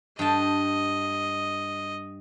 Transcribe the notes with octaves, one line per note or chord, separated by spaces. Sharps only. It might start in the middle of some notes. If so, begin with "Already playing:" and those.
G2 D#5 G5 A5